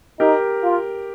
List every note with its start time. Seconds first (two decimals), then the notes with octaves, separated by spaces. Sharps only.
0.20 D#4 G4 A#4
0.63 F4